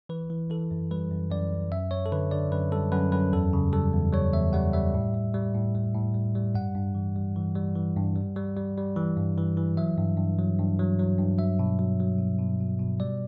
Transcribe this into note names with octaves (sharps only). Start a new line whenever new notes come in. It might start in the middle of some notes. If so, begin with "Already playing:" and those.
E3 B4
E3
E3 A4
F#2
G3 B4
F#2
F#2 D5
F#2
F#2 E5
F#2 C#5
A4
D3 B4
D3 D5
F#2 B4
G3 A4
F#2 B4
F#2 B4
E2 A4
C#3
G3 A4
E2
G3 C#5
E2 E5
G3 F#5
G3 E5
A2
G3
G3
A2
G3
A2
G3
G3
G2 F#5
G2
E3
G3
E3
G3
E3
G2
G3
G3
G3
G3
E3
G2
E3
E3
F#3 E5
G2
G2
F#3
G2
F#3
F#3
G2
F#3 E5
B2
F#3
F#3
B2
B2
B2
B2
G3 D5